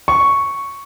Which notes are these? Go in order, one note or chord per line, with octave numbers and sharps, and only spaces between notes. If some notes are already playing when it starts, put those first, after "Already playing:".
C#6